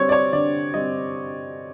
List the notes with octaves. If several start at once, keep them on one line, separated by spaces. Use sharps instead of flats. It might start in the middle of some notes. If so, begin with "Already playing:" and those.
Already playing: D3 G3 C4 C#5
D5
C#5
D3 D5
G3 C4 D#5